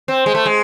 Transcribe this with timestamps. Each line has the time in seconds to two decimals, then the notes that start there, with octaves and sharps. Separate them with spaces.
0.08 C4
0.26 G#3
0.34 A3
0.46 G#3